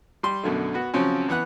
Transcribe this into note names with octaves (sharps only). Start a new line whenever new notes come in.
G3 C6
F#2 B2 D3 A3
B3 F#4
C#3 F3 F#3 C4 C#4
E3 B3 F#5 F#6